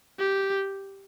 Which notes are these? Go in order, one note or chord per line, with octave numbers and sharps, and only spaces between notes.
G4